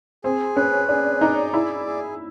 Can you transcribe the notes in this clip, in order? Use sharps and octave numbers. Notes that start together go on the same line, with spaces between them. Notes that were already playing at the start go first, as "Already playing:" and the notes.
C4 G#4
C#4 B4
D4 G#4
D#4 D5
E4 G#4
G#4